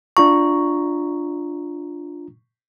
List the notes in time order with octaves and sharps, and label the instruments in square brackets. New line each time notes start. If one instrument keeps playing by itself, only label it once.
[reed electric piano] D4 F4 A#5 [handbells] C#6